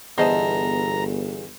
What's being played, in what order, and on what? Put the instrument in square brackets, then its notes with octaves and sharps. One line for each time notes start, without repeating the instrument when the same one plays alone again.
[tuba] G1 [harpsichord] E2 [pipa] C5 D#5 A5 [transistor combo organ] A#5